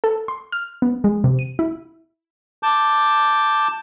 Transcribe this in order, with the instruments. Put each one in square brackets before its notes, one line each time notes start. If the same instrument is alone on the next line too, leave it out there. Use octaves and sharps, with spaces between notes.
[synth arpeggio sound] A4
C6
F6
B3
G#3
C3
D#7
E4
[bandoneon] A5 D6 G6